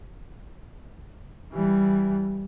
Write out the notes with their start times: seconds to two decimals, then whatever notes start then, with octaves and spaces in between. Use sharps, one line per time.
1.52 E3 G3